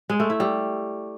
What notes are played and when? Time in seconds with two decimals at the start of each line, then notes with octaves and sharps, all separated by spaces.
0.10 G#3
0.20 A3
0.30 E4
0.40 G3